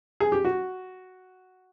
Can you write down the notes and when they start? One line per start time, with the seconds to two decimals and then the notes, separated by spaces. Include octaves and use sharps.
0.20 G#4
0.32 G4
0.45 F#4